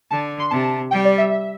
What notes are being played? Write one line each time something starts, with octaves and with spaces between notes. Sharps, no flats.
D3 A5
C6
C3 A5
G3 G5
D5
E5